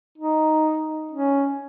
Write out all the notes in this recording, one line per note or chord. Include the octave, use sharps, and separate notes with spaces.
D#4
C#4